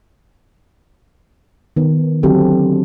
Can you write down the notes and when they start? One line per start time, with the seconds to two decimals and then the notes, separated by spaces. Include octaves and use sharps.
1.76 D#3 B3
2.23 D3 F#3 C4 F#4 G4 A4